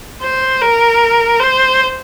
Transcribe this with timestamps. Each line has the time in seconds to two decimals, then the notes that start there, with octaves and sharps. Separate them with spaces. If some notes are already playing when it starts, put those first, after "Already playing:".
0.22 C5
0.61 A#4
1.40 C5